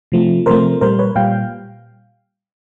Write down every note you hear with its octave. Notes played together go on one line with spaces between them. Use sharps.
C3 F3 A3
C3 F3 A3 A#4 C5
A#2 G3 A#4 C5
B4 C#5
A#2 G3 F5 G5